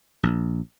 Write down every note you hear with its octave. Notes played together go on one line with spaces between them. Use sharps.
A#1